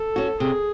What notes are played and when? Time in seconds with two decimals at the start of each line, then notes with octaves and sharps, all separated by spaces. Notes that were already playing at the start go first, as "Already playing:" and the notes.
Already playing: A4
0.16 C#4 F#4
0.40 C3 G#4